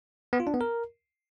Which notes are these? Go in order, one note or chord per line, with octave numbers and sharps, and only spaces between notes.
B3
F4
D4
B3
A#4